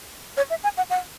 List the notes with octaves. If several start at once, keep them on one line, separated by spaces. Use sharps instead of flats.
C#5
E5
G#5
F#5
F#5